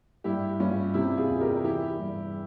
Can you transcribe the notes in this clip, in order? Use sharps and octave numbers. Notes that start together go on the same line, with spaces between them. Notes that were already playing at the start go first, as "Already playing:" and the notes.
G2 E4 G4
G2 C#4 F4
C3 E4 G4
F4 G#4
E2
G4 A#4
E3 E4 G4
G2